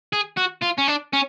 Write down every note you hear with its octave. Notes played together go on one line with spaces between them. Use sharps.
G#4
F#4
F4
C#4
D4
C#4